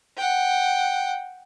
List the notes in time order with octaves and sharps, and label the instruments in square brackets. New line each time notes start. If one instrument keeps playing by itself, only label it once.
[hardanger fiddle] F#5 G5